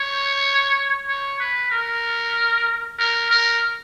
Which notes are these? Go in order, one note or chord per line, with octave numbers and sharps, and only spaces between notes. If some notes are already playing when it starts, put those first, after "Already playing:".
Already playing: C#5
C#5
B4
A#4
A#4
A#4